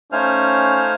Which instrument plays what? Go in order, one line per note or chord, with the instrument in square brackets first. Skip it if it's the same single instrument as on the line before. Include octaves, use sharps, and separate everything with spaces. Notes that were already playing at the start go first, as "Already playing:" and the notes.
[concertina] A3 D#4 F6 [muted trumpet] C#4 [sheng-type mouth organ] C5 F5 G#5